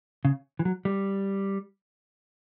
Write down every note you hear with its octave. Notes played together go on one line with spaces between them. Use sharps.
C#3
E3
F#3
G3